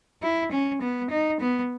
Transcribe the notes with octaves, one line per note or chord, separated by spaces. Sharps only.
E4
C#4
B3
D#4
B3